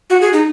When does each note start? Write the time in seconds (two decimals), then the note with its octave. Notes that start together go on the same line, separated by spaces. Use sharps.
0.10 F#4
0.21 G#4
0.33 D#4